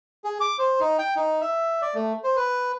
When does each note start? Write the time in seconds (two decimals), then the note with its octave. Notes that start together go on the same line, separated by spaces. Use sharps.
0.24 G#4
0.40 D6
0.59 C5
0.80 D#4
0.99 G5
1.16 D#4
1.41 E5
1.82 D5
1.95 A3
2.24 C5
2.36 B4